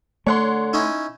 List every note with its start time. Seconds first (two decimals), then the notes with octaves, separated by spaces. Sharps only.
0.27 D3 A3 C#5 F#5 C6
0.73 C#4 D#4 E4